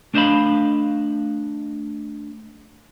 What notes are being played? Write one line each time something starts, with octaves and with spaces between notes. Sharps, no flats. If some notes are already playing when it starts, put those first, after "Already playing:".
A3 D4 C5 D#5 F5 B5